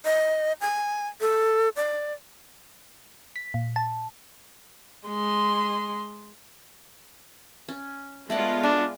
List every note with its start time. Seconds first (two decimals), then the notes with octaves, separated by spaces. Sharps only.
0.05 D#5
0.61 G#5
1.21 A4
1.76 D5
3.36 B6
3.54 A#2
3.76 A5
5.08 G#3 C6
7.68 C#4
8.30 G#3 A3 B3 F4 D5 F#5
8.63 D4 G#5